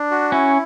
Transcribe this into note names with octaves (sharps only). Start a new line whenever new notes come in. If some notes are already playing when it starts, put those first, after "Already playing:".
Already playing: D4
F#4
C#4 E4